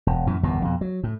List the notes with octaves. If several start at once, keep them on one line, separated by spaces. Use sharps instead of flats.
E1
F#2 A#2 E3
G1 E2 A#2
F2 B2
F#3
A2